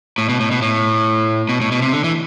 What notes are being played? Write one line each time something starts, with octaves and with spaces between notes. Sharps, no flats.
A2
B2
A2
B2
A2
B2
A2
B2
C3
D3
E3